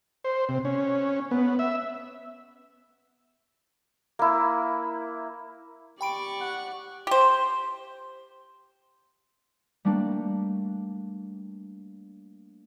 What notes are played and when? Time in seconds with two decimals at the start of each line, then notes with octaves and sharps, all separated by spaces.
0.24 C5
0.49 C3
0.65 C#4
1.31 B3
1.59 E5
4.19 A#3 E4
6.01 G4 D5 G5 B5 C#6 D7
6.41 F#5
7.07 G4 C5
9.85 G3 A3 A#3 D4